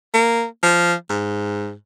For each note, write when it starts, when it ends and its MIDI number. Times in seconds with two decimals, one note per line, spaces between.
0.14 0.44 58
0.63 0.94 53
1.09 1.73 44